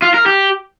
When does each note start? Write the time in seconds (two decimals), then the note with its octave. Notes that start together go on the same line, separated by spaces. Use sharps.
0.02 F4
0.14 A#4
0.26 G4